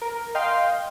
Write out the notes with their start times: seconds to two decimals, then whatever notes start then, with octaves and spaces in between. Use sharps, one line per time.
0.02 A#4
0.35 D#5 F5 G5 C6